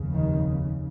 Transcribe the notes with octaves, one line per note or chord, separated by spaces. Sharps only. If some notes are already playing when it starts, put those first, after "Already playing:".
Already playing: F1 D#2 C#3
D#3